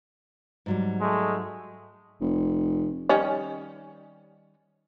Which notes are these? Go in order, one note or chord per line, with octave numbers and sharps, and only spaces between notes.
G#2 F#3 G3
G#3 A3
F1
D#3 G3 C#4